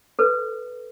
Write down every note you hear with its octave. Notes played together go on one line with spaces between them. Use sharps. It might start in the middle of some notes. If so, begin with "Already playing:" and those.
A4 B4 C5